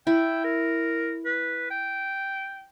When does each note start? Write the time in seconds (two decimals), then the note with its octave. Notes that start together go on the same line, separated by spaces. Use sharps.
0.07 E4 G5
0.44 A#4
1.25 B4
1.70 G5